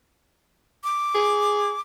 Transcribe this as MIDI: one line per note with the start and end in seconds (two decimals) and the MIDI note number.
0.84 1.80 86
1.15 1.73 68